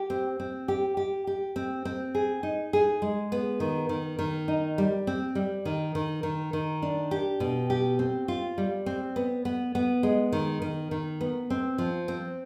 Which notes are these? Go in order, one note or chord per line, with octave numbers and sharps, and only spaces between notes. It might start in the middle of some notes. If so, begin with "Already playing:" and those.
Already playing: G4
C4
C4
G4
G4
G4
C4
C4
G#4
D#4
G#4
G#3
B3
D#3
D#3
D#3
D#4
G3
C4
G3
D#3
D#3
D#3
D#3
D4
G4
B2
G4
C4
F4
G3
C4
B3
B3
B3
G#3
D#3
D#3
D#3
B3
C4
F3
C4